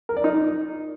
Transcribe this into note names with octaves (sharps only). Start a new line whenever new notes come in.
A#4
D5
D#4